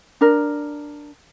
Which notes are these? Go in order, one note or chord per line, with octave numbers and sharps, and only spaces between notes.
D4 A#4